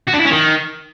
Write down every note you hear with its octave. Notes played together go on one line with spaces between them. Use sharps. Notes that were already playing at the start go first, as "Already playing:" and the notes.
F#4
D4
E4
C#4
D#3